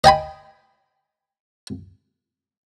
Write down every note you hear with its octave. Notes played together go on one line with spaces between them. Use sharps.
D#5 G5 G#5 B5